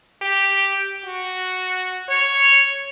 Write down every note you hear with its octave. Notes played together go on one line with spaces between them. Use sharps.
G4
F#4
C#5